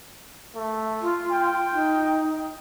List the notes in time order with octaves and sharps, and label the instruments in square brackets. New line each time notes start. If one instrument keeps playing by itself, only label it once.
[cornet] A3
[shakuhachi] F4
[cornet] G5
[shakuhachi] D#4